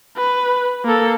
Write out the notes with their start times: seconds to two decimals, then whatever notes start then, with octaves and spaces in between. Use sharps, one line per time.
0.17 B4
0.85 A#3 A4